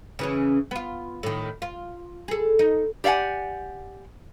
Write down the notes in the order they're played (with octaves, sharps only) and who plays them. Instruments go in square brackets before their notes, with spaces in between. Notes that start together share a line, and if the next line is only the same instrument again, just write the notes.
[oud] C#3 E3 C#4
B3 F4
A2 D#3
F4
G#4 A4
D#4
[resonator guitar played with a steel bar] G4 D5 E5 F#5 G#5